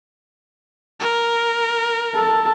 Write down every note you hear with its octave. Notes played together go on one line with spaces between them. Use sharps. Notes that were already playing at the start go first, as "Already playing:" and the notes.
A#4
A4 A5